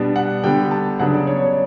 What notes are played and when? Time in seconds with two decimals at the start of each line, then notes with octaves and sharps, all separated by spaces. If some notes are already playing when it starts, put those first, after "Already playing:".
Already playing: B2 G3 B3 D4
0.16 F#5
0.44 D3 G3 B3 G5
0.71 A5
1.00 C#3 F#3 B3 D4 F#5
1.14 D5
1.27 C#5
1.42 C#5